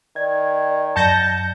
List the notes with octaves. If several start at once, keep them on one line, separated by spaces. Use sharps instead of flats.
D#3 D5 G#6
F#2 A5 G6 A#6 C#7